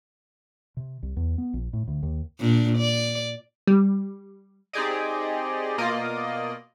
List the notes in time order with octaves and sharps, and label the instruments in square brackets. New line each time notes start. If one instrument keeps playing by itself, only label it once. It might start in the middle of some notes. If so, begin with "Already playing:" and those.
[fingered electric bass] C3
C2
E2
B3
A#1
A2
D2
D#2
[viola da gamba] A#2 D4
D5
[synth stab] G3
[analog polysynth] C4 D#4 G4 G#4 D5 D#5
B2 A#3 F4 D5 D#5